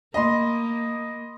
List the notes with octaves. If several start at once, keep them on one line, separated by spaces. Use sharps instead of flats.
A#3 D#5 B5 C6